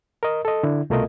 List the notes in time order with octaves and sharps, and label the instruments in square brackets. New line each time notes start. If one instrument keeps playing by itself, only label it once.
[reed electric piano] A#4 D#5
A4 D#5
D3 D4 E4
C2 B2 A3 F4 A#4 D#5